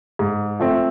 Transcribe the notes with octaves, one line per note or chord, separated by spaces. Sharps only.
G#2
F3 A3 C4